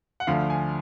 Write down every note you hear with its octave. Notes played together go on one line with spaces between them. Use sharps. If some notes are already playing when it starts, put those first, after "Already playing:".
F#5
D2 D3 F3 A3 F5
G#5